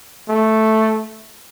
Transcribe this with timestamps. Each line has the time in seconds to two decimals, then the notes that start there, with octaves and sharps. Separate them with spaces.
0.29 A3